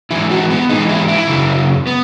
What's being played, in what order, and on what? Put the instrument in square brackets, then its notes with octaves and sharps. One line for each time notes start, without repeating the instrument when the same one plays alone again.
[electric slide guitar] G#2 E3 E4
F#4
B3
G#2 E3 D#4
E4
E4
F#2 C#3
B3